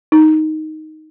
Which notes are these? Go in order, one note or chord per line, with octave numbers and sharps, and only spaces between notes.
D#4